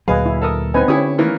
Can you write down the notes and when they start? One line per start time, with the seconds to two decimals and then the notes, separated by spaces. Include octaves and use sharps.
0.08 D2 A#2 F#3 G#4 B4 D#5 F5 G#5
0.26 E4
0.42 A4 A#4 D#6
0.74 B3 C4 D#4 B4 G#5
0.88 D3 C#4 E4 G4 C#5 D#6
1.18 D#3 E3 A#3